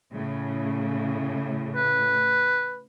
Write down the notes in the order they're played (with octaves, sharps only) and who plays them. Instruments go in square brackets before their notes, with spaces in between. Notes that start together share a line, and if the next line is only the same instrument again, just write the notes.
[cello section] A2 C#3
[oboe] B4